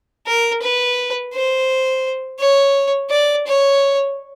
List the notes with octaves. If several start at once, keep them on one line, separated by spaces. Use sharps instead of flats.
A#4
B4
C5
C#5
D5
C#5